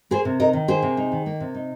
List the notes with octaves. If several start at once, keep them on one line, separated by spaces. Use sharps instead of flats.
A#3 G#4 C5
C3
D#4 A#4 D#5
D#3
A#3 G#4 C5
C3
D#4
D#3
A#3
C3
D#4